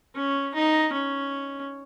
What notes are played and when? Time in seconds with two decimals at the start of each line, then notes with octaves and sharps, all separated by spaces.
0.15 C#4
0.54 D#4
0.92 C#4